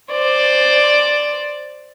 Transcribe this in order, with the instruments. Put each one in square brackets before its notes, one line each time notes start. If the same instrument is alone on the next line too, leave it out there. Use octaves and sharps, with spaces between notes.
[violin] C5 D5